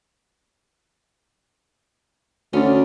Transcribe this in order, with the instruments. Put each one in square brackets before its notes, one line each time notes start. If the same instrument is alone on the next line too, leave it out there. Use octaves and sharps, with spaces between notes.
[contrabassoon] D2 [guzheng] C#4 D5